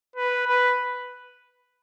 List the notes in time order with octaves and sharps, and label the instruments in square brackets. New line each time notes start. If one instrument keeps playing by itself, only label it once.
[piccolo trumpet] B4
B4